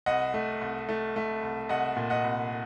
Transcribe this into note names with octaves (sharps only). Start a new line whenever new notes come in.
C2 D#5 F#5
A3
C2
A3
A3
C2
C2 D#5 F#5
A#2
D#5 F#5
C2